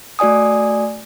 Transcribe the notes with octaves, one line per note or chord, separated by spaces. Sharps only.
A3 F#4 D5 G#5 D#6